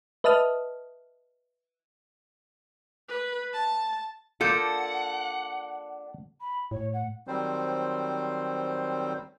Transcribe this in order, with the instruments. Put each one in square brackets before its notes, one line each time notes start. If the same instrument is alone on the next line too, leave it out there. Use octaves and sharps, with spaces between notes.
[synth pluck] B4 D#5 E5 A5 D#6 F6
[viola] B4
A5
[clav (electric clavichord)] A#3 F4 [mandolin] D4 D#6 G6 [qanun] A4 [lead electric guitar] F#5
[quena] B5
[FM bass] A2 [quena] C#5
[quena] F#5
[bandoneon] D#3 F#3 G3 C4 C5